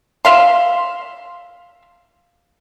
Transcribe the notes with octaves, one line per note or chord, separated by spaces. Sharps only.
E5 F5 C6